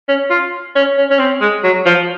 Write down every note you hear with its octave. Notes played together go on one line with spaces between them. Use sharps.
C#4
F4
C#4
C#4
C#4
C4
G#3
F#3
F3